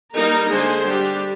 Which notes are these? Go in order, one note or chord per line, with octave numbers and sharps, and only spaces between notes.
G3 A#3 D#4 A#4
D3 G#3 D4 G#4 C5
G3 D4 G4